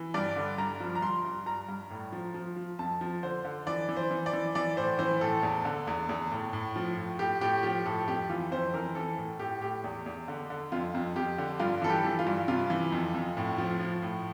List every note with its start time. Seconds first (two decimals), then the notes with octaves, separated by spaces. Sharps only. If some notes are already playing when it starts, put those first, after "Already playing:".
Already playing: E3
0.14 G2 D5
0.36 D3
0.58 G2 A#5
0.80 F3
0.95 A#5
1.02 G2 C6
1.25 G2
1.46 G2 A#5
1.69 G2
1.90 A2
2.12 F3
2.34 F3
2.56 F3
2.79 F2 A5
3.01 F3
3.23 D3 C5
3.45 D3
3.67 E3 D5
3.89 E3
3.97 C5
4.11 E3
4.26 D5
4.33 E3
4.55 E3 D5
4.77 A2 C5
4.99 E3 C5
5.21 A2 A4
5.43 E2
5.65 D3
5.87 E2
6.09 E2
6.32 A2
6.53 A2
6.76 F3
6.97 A2
7.19 A2 G4
7.41 A2 G4
7.63 F3 G4
7.85 A2 A4
8.07 F2 G4
8.29 E3 F4
8.52 F2 C5
8.74 E3 A#4
8.95 E3 A4
9.18 A2
9.39 A2 G4
9.62 A2 G4
9.84 E2
10.06 E2
10.28 D3
10.50 D3
10.72 F2 F4
10.95 F2
11.16 F2 G4
11.38 D3
11.59 G2 F4
11.82 E3 A4
11.89 G4
12.04 E3
12.19 F4
12.27 G2
12.48 C3 F4
12.70 E3
12.92 F2
13.14 F2
13.37 A2
13.58 F3
13.80 F3
14.02 A2